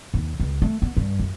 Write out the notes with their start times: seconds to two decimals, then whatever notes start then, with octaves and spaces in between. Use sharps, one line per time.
0.14 D#2
0.40 C#2
0.62 A3
0.82 B3
0.97 G2
1.19 F#2